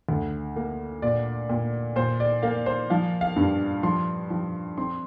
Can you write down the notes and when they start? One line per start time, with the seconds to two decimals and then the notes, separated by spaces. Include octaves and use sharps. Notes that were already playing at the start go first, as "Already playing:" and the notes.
0.09 D2
0.56 A#3
1.02 A#2 D5
1.49 A#2
1.96 A#2 C5
2.20 D5
2.43 A#3 F5
2.66 C5
2.90 F3 F5
3.21 F5
3.36 G2
3.83 F3 C6
4.30 F3
4.78 C4 C6